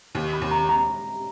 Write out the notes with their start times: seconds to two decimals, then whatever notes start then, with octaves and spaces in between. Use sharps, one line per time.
0.15 D#2
0.33 B5
0.41 D#2
0.51 A#5
0.69 A#5